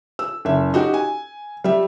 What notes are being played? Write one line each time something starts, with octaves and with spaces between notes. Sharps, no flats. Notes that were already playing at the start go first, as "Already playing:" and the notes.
E6
F#1 E5
D#4 F#4 G4
G#5
G3 E5